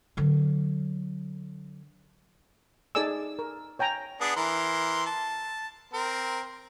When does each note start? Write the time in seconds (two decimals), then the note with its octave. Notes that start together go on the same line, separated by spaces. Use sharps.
0.17 D3 F#3
2.95 D#4 G#4 A4 D5 G#5 E6
3.39 A#4
3.79 C#5 G5 G#5 A#5
4.21 B3 D4 G#4
4.36 E3 A#4 C6
5.06 A5
5.94 C4 A#4